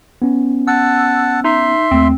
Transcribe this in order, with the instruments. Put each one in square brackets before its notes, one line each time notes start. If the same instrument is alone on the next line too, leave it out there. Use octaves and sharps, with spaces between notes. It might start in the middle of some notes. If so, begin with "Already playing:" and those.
[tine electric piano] B3 C#4
[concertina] F#5 A5 [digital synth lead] E6
[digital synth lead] D#4 [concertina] E5 C6
[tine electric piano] D#2 A3 [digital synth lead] C4